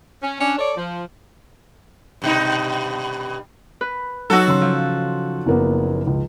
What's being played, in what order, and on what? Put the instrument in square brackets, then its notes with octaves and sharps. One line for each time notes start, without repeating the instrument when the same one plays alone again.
[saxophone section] C#4
C#4 D4
A4 C#5 D5
F3
[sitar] G2 B2 D#4
[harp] B4
[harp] F#3 D#4 [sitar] F#4 A4
[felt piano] C#3 C6
[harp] F3
[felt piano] F#1 A#3 B3
C#2